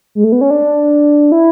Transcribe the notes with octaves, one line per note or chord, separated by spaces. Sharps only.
G#3
A3
B3
C#4
D4
E4